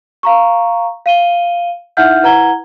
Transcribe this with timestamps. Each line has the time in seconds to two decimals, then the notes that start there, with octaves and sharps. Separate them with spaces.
0.23 F5 A#5 C#6
1.06 F5 D#7 G7
1.97 D#4 E4 E5 F#5 F6 G6
2.23 E4 B4 F#5 A#5 G#6 G7